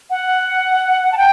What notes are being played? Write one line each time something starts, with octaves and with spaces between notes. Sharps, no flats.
F#5
A5
G5